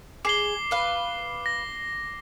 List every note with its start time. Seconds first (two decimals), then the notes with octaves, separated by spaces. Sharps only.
0.25 G#4 D6 C7 G7
0.71 B4 F5
1.46 A#6